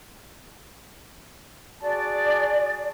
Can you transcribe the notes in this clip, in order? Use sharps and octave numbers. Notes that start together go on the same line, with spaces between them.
F#4 G#4 D5 A5